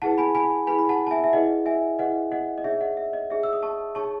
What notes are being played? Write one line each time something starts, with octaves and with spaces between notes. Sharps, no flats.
E4 G#4 B4 F#5 A5
G#5 B5
G#5 B5
E4 G#4 B4 G#5 B5
B5
F#5 A5
A5
E5 G#5
E5
E4 G#4 B4 D#5 F#5
E5 G#5
E4 G#4 B4 D#5 F#5
D#5 F#5
D#5
D#4 G#4 C#5 E5
D#5 F#5
E5
D#5
D#4 G#4 C#5 E5
E6
D#6
A5 C#6
D#4 G#4 C#5 A5 C#6